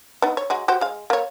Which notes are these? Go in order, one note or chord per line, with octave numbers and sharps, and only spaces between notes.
B3 D#4
C#5
F#3 G#3 F#4
F#4 G4 C5
G#3 F5
A#3 C#5